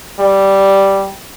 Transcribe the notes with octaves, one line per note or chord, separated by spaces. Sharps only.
G3